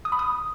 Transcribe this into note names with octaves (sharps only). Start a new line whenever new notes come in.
D#6
B5
D#6